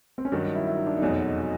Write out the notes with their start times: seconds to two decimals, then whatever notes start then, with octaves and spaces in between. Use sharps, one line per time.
0.18 C4
0.25 C#4
0.32 G2 D#3 F#3 D4
0.44 D#4
0.55 E4
0.67 E4
0.77 D#4
0.87 D4
0.97 D#4
1.02 F1 E2 B2 F#3